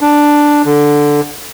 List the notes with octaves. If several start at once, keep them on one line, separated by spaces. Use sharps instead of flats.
D4
D3